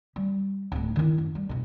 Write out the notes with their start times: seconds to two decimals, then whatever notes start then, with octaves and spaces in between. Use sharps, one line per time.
0.16 G3
0.72 D1 G#3
0.96 D#3 E4
1.18 F#2
1.35 G3
1.49 F1 B2